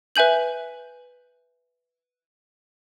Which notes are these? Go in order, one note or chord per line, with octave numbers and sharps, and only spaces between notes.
B4 E5 G#5 G6 F#7